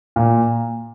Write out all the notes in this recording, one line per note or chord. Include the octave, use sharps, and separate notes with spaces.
A#2